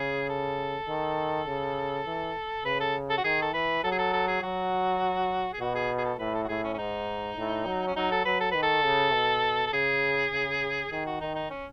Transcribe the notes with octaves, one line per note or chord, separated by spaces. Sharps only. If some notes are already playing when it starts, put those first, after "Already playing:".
Already playing: C#3 G#4
A4
D#3
C#3
E3
C#3 B4
A4
A4
F#4
D#3 G#4
A4
E3 B4
F#3 A4
G#4
A4
A4
G#4
F#3 F#4
G#4
B2 F#4
G#4
G#4
A4
A2 B4
A4
F#4
A2 G#4
C#4
C#4
G#2 D#4
A2
F#3
C#4
F#3 D#4
A4
F#3 B4
A4
D#3 B4
A4
C#3
B2
A4
C#3 G#4
C#3
D#3 G#4
F#4
D#3 D#4
D#4
C#4